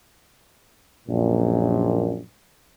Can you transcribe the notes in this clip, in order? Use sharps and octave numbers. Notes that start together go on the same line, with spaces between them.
A#1 F#2 A#2